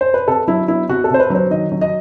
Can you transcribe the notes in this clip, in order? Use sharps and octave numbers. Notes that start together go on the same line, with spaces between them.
C5
B4
C3 A4
F#3 E4
B3 E4
C3 F#4
A4
C3 C5
B4
F#3 C5
D#3 D#5
F#3
D#5